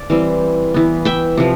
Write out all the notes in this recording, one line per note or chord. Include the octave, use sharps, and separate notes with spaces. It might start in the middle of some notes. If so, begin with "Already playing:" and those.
Already playing: D5
E3 G3 C4
E3 B3
E5 G5
C3 F3